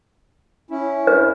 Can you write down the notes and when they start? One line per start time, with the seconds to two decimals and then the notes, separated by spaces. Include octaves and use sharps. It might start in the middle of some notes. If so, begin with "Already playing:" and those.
0.71 C#4 E4
1.07 B4